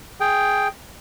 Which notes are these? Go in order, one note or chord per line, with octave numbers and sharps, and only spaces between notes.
G#4 G5